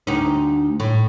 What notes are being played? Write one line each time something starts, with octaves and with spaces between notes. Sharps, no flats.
D2 D#4
A2